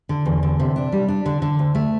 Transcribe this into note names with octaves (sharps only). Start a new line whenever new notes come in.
D3
E2
D3
C3
D4
G3
D4
D3
D3
D2
A3